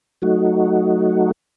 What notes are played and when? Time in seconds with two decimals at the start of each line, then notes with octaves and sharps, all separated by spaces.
0.22 F#3 A3 D#4 F#4